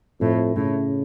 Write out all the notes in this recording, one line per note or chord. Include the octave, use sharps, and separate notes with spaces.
F2 A2
A2 C#3